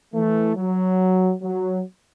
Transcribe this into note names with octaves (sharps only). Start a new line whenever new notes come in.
E3 A3
F#3
F#3